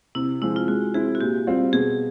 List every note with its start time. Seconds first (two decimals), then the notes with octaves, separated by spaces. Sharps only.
0.15 C3 E4
0.42 F3 G#3 C4 E4
0.56 F4
0.68 G#3 F#4
0.94 C4 E4 G#4
1.15 F#4
1.20 A#2 G4
1.47 G3 C4 F4
1.73 B2 G#4